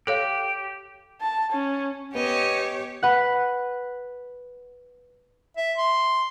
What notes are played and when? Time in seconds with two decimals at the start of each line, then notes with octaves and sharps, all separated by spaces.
0.07 G4 A4 C#5 F5
1.21 A5
1.53 C#4
2.15 B3 G4 C#5 D#5 G#5
3.03 B4 F#5
5.57 E5
5.78 C6